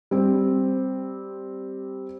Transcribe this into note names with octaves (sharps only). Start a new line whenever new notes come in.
G3 C4